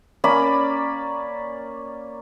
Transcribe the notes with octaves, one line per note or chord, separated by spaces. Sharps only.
A#3 C#4 D5 B5